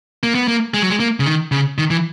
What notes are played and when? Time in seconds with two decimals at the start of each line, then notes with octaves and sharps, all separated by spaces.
0.23 A#3
0.35 B3
0.48 A#3
0.74 G#3
0.82 F#3
0.90 G#3
1.00 A#3
1.20 C#3
1.26 D#3
1.51 C#3
1.78 D#3
1.91 E3